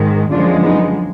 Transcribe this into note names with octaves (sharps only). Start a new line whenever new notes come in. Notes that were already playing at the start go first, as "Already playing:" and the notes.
Already playing: G#2 D#3 G#3
F#2 D3 F3 G#3 D4 F4
B3 D#4